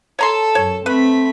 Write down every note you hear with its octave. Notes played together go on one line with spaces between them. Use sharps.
A4 C#5 A5 A#5 C6
F#2 C#5
A3 C4 B4 B5